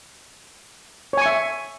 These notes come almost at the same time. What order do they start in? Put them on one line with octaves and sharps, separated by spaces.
C#5 G#5 C#6 E5